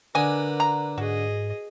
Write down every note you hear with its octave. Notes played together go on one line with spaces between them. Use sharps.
D3 A#4 B4 D#5 G#5
A#5
G#2 F#4 G#4 D#5